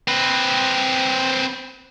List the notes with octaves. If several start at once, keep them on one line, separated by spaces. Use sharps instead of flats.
C4 B4